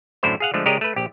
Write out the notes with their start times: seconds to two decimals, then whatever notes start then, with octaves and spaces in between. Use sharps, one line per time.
0.23 F#2 A2 D3 E4 C5
0.40 G#4 F5 F#5
0.54 D3 F3 G#3 A3
0.66 C#3 G#3 G4 A#4 D5 D#5
0.81 A3 B4
0.96 A#1 G4